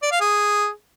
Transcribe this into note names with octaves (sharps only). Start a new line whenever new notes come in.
D5
F5
G#4